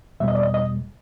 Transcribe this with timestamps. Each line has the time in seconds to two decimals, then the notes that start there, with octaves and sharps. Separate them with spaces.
0.20 E2 B2 G3 E5
0.28 D#5
0.35 D5
0.43 D#5
0.54 D#5